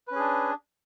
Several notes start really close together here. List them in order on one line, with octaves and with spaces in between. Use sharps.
B4 C#4 G#4 D4